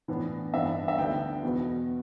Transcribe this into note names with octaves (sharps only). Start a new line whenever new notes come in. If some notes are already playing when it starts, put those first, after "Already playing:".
A2 E3 B3 D4
G2 E3 B3 D4 E5
E5
D2 D3 B3 D4 G5
E2 B2 B3